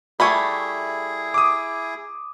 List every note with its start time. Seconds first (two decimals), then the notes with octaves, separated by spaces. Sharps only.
0.20 G3 A3 E4 G#4 G#5 B5 C#6
1.34 D6 D#6